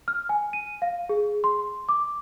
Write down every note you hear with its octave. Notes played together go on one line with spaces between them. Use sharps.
F6
G#5
D#7
F5
G#4
C6
D6